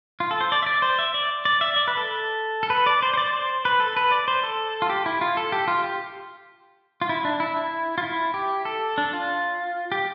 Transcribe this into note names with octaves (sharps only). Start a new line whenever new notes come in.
F4
A4
C5
D5
E5
D5
C5
E5
D5
D5
E5
D5
B4
A4
A4
B4
D5
C5
C5
D5
C5
B4
A4
B4
D5
C5
A4
F4
G4
E4
F4
A4
G4
F4
G4
F4
E4
D4
E4
E4
F4
E4
G4
A4
D4
F4
G4